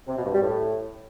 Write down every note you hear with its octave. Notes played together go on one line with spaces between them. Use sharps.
C3
B2
G2
G3
A2